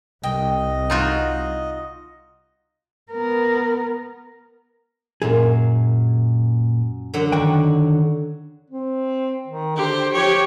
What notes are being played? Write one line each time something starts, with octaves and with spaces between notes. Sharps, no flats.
C2 D#5 G5
D#4 F4 F#4
B3 A#4
F#2 A#2 G#4
D3 F#3 F#5
D3 D#3 F#4 G5
C4
D#3
D3 G4 C5
F3 G4 C#5